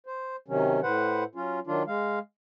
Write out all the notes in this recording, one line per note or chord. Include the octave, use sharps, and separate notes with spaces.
C5
C3 D#3 F#3 C#4
A2 B4 C5 F#5
F#3 C#4 F4
D#3 F#3 D4 F4
G#3 F5